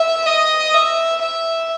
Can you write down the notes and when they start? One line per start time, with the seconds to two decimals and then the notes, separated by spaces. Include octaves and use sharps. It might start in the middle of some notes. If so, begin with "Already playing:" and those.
Already playing: E5
0.26 D#5
0.73 E5
1.22 E5